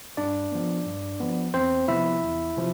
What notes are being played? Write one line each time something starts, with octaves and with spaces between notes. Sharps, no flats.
G2 D4 D5
F3 B3
G2
F3 B3
E2 C4 C5
C3 F3 B3 E4 E5
E2
C3 F3